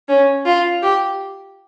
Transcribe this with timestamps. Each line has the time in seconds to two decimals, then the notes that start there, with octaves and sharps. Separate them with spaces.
0.08 C#4
0.46 F4
0.82 G4